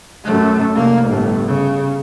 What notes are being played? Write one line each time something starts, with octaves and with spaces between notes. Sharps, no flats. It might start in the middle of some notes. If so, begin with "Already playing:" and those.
F#2 A3
F1 A#3
G1 A2
C#3